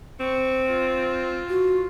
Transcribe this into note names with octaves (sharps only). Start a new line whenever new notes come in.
C4 C#6
F4
F#4